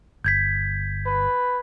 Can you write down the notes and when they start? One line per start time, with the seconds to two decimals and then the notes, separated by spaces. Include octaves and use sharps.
0.24 G1 G6 G#6 B6
1.06 B4